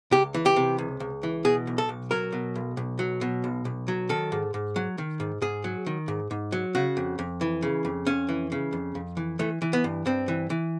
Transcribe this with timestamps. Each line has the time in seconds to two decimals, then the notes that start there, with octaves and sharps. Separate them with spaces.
0.12 C#2 G4
0.34 E3
0.46 G4
0.56 C3
0.78 C#2
1.00 C#2
1.23 E3
1.45 B2 G#4
1.67 B1
1.78 A4
1.89 B1
2.11 F#3 A#4
2.32 B2
2.55 B1
2.77 B1
2.99 F#3
3.21 B2
3.44 B1
3.65 B1
3.88 F#3
4.09 D#3 A4
4.32 G#2
4.54 G#2
4.76 F#3
4.98 D#3
5.20 G#2
5.41 G#2 G#4
5.64 F#3
5.86 D#3
6.08 G#2
6.31 G#2
6.52 F#3
6.75 C#3 F#4
6.97 F2
7.19 F2
7.41 E3
7.62 C#3
7.85 F2
8.07 F2 C#4
8.29 E3
8.52 C#3
8.73 F2
8.95 F2
9.17 E3
9.39 E3 A3
9.62 E3
9.73 B3
9.84 G2
10.06 G2 C4
10.28 E3
10.50 E3